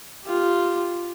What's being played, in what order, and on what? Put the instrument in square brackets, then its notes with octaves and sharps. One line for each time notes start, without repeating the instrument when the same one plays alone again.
[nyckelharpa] F4 G4